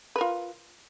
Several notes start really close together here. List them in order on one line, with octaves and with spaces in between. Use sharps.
B4 A#4 F4